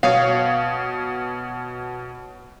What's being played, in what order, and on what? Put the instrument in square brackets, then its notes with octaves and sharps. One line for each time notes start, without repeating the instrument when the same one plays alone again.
[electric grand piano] B2 C#5 D#6 [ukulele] F5